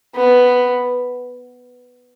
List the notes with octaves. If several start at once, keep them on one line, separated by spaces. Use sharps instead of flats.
B3